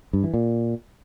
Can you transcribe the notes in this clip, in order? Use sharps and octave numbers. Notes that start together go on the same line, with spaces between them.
G2
E3
A#2